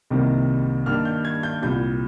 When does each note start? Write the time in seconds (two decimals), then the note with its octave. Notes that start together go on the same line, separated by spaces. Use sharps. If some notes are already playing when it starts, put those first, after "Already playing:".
0.10 C2 C3 D#3 G3 A#3
0.86 G2 D#3 G3 A#3 D4 F6
1.05 G6
1.25 G#6
1.43 G6
1.62 C2 A#2 G3 G6